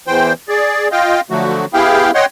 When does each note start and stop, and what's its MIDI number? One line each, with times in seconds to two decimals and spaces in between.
0.07 0.33 40
0.07 0.33 52
0.07 0.33 72
0.07 0.33 79
0.49 0.88 68
0.49 0.88 74
0.92 1.20 65
0.92 1.20 75
0.92 1.20 77
0.92 1.20 79
1.30 1.65 50
1.30 1.65 53
1.30 1.65 54
1.30 1.65 57
1.30 1.65 66
1.74 2.11 59
1.74 2.11 64
1.74 2.11 67
1.74 2.11 68
1.74 2.11 77
1.74 2.11 79
2.15 2.25 73
2.15 2.25 75
2.15 2.25 78
2.15 2.25 79
2.15 2.25 84